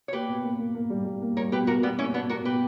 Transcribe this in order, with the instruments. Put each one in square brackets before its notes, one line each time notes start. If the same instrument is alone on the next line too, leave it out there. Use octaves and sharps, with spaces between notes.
[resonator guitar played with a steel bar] C#5
[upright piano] A#3 [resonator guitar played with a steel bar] G4 B4
[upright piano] B2
A#3
A#3
A#3
G3
G3
A#3
[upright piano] G3 [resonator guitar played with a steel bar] A#4 C#5
[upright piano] B2 [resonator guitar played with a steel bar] G4 B4
[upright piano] B2 [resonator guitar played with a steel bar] F#4 A#4
[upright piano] B2 [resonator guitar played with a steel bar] G3 B3
[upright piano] A#3 [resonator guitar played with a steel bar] C#4 E4
[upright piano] B2 [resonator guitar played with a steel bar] B3 D4
[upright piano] B2 [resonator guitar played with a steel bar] F#4 A#4
[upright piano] B2 [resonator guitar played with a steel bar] G4 B4